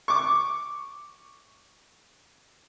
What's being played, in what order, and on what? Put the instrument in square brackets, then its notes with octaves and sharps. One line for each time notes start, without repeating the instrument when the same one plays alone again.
[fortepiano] C#6 D6